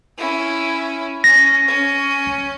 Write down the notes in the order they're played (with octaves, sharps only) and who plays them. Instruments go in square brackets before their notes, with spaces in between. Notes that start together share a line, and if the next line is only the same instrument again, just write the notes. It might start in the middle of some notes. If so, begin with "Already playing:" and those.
[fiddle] C#4 E4
[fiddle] C#4 [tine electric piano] A#6
[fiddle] C#4